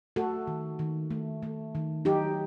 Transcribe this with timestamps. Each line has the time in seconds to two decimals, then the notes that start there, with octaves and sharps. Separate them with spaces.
0.16 A3 F#4 A4
0.47 D#3
0.79 D#3
1.10 A3
1.42 A3
1.75 D#3
2.05 F#3 D#4 G4